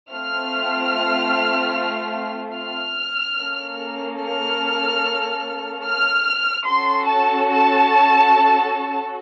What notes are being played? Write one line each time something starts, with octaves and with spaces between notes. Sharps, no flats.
A3 C4 F4 F6
F6
A#3 C#4 A4
F6
F6
C#4 F#4 A4 C6
A5
A5